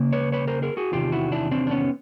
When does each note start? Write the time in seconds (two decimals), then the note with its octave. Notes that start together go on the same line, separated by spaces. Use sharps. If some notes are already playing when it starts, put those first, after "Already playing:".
Already playing: C#3 A#3
0.13 B4 C#5
0.32 B4 C#5
0.48 A#4 C5
0.62 G#4 A#4
0.77 F#4 G#4
0.92 E2 C3 D#3 F4 G4
1.12 E4 F#4
1.32 D4 E4
1.51 C4 D4
1.67 D4
1.71 B3 C#4